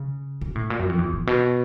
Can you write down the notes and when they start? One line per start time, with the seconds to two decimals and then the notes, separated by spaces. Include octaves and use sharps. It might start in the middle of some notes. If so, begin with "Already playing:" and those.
Already playing: C#3
0.41 B2
0.55 A2
0.70 A#2
0.79 F#2
0.89 F2
0.99 E2
1.13 A2
1.27 B2